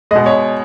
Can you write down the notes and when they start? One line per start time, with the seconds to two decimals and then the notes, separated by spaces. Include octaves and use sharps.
0.11 B2 G#3 D#5
0.26 C#5